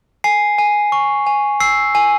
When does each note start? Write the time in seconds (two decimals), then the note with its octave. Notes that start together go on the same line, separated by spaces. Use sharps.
0.24 G#5 C7
0.58 G#5
0.92 C#6
1.27 G#5
1.60 E6 C7
1.95 G#5